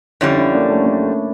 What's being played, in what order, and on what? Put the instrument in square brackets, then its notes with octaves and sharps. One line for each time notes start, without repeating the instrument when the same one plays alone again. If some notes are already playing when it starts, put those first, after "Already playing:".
[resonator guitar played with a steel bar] F2 D3 G3 [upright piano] C#4 E4
[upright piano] C#4 E4
A#3 D4
A3 C#4
A3 C#4